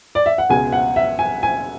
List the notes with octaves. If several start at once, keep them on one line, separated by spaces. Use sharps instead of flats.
D5
E5
F#5
C#2 B2 G#3 G#5
F#5
E5
G#5
G#5